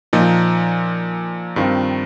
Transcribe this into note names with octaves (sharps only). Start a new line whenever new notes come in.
A#2 F3 D#4
G2 D#3 C4 F4